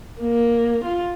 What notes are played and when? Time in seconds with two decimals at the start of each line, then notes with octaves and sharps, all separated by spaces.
0.20 A#3
0.84 F4